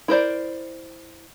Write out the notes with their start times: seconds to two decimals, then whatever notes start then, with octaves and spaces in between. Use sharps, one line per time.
0.08 E4 A#4 C5 D5